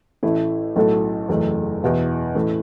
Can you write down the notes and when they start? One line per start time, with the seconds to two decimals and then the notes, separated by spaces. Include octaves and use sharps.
0.23 A1 A2 A3 E4
0.76 B1 A2 A3 F#4 A4
1.29 F#1 E2 E3 A3
1.83 E2 B2 B3 E4
2.35 A1 A2 A3